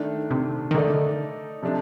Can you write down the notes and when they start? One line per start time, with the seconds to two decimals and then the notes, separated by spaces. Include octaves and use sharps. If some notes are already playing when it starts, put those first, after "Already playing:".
Already playing: D#3 A3 D4
0.31 C3
0.71 D#3
0.74 D3 A3 D#4 A4 D5
1.63 C3 F3 A3 D4